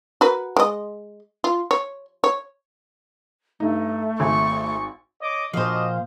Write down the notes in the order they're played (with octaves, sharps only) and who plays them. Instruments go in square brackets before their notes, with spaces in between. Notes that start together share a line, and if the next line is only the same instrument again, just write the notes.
[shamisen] F#4 A#4 B4
G#3 D#5
F4
C#5
C#5
[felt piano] G2 D#4 [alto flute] A3
[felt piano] G#1 G#5 [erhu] C#6
[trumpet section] C#5 D#5 D6
[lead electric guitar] A#2 F3 [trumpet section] D4 F#4 D#5 [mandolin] C5 F5